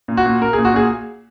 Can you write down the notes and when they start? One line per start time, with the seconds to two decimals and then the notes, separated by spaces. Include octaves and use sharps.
0.08 A#2
0.17 F#4
0.25 A#2
0.41 A#2 A#4
0.53 G#4
0.58 A#2
0.65 F#4
0.74 A#2 G#4